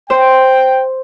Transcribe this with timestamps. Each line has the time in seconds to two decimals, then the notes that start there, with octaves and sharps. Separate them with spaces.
0.10 C5 G5